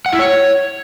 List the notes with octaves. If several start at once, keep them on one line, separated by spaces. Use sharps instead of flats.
F#5
E4
C#5